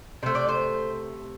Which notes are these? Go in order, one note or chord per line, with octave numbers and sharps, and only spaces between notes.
C3 A3 C5
D5
C5